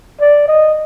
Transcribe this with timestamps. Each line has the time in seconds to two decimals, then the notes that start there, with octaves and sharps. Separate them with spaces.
0.21 D5
0.48 D#5